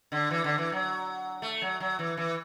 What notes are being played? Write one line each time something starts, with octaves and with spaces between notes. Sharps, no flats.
D3
E3
D3
E3
F#3
A3
F#3
F#3
E3
E3